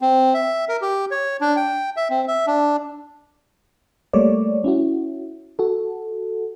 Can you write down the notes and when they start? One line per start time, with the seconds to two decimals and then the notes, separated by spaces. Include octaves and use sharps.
0.01 C4
0.34 E5
0.69 A#4
0.82 G4
1.11 C#5
1.41 D4
1.56 G5
1.97 E5
2.10 C4
2.28 E5
2.47 D4
4.13 G3 A3 A#3 C#5 D5
4.64 C#4 E4 F#4
5.59 F#4 A4